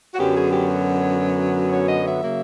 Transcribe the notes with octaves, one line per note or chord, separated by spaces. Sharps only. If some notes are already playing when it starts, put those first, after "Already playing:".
F#4
F#2 D3 F#3 B3 G4
G#4
G4
C#5
D#5
E5
C#3 F#3 A#3